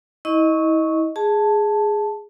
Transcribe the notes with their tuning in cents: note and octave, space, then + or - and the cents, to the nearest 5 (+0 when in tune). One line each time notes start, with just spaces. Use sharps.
E4 -35 D#5 +0 C#6 +0
G#4 +0 A5 +0